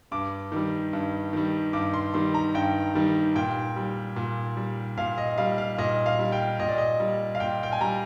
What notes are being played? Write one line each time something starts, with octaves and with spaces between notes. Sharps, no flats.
G2 D6
D#3 G3
G2
D#3 G3
G2 D6
C6
D#3 G3 C6
A#5
G2 G5
D#3 G3
A#2 G5
G3
A#2
G3
A#2 F5
D#5
G3 F5
F5
A#2 D#5
F5
G3
G5
A#2 D#5
D5
D#5
G3
F5
A#2 G5
G5
G#5
G3 A#5